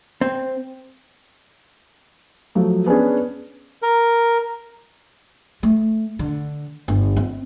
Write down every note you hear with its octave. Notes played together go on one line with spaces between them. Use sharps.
C4
F3 F#3 A3
B3 C#4 D4 G#4
A#4
A3
D3
G1
C4